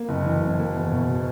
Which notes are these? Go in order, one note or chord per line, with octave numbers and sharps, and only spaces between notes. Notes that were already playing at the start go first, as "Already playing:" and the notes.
Already playing: A#3
F#1
E3
F#1
A#3
E2
B2